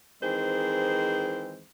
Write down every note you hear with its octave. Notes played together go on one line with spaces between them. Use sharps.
D#3 E3 G#3 C4 G#4 C5